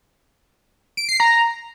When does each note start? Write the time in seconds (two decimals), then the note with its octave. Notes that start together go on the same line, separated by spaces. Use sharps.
0.97 D7
1.09 C7
1.20 A#5